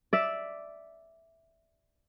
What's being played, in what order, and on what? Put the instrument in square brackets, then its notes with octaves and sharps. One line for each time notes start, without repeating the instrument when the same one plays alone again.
[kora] D5 E5